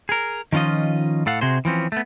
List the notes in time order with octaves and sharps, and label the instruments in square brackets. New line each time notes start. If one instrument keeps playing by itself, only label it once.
[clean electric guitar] G#4 A#4
D#3 F3 C#4 F4 D#5
A2 A4 F5 F#5
C3 F#4 G#4 C5
E3 F3 C4 C#4
A3 B3